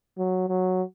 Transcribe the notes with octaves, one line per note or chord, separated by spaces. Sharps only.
F#3
F#3